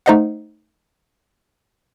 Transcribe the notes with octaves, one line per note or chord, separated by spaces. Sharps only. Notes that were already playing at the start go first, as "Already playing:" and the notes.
A3 D#4 C5 D#5 F5 F#5